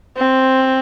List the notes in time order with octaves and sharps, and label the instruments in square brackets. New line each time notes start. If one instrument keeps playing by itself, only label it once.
[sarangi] C4